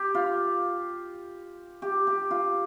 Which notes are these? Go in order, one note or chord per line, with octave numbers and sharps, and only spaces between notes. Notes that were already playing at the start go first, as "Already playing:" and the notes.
Already playing: G4
F4
G4
G4
F4